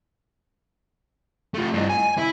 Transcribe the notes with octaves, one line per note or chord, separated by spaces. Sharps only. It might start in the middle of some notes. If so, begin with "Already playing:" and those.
F3 A3
G2 D#5
G#5
E4